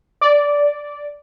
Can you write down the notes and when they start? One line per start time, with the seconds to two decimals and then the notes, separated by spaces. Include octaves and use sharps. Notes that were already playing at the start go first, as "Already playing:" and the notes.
0.21 D5